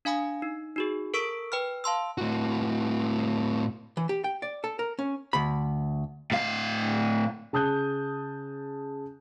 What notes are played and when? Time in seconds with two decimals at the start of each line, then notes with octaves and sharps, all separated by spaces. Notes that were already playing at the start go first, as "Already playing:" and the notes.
0.05 D4 F5 G#5 B5 D#6
0.42 D#4
0.76 D#4 F#4 G#4
1.14 A4 A#4 C#6 E6 B6 D7
1.52 B4 G5 B5 F6
1.84 F5 A5 C6 E6
2.18 A2 F#4
3.97 E3
4.09 G4
4.24 G5
4.42 D5
4.64 A4
4.79 A#4
4.99 C#4
5.33 D2 B5
6.32 A2 F5
7.53 C#3 A5 D#6 F#6 G6